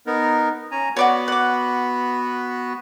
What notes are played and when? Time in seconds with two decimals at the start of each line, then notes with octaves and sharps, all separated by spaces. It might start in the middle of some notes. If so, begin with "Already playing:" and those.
0.07 B3 D#4 A#4
0.72 C#4 G#5 A#5
0.97 B3 F#4 B4 C#5 D5 F#5
1.28 F#5 D6